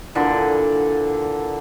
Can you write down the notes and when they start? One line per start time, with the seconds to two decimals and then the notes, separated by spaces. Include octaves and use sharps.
0.15 A#2 D3 E3